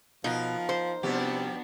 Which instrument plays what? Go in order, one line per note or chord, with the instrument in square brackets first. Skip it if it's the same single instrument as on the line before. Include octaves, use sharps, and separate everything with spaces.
[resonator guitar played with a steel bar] B2 [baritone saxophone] F3 [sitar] D#4 A#4
[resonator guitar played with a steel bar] C5
[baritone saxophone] C3 [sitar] F3 G3 G4 [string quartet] B3 D4 F#4